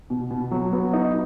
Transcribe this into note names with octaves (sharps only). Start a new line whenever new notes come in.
B2
B2
F#3
B3
D#4